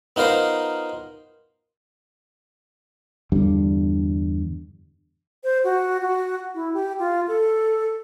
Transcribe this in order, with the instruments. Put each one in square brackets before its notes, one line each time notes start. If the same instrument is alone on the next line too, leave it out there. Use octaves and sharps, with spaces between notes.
[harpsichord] B3 D#4 F4 A#4 C5
[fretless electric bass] E2 G2 D3 G3
[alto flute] C5
F#4
F#4
E4
G4
F4
A4